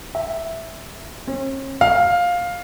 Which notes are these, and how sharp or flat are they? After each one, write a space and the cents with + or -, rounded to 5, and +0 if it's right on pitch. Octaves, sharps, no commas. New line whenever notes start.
E5 -5
C#4 -45
F5 +10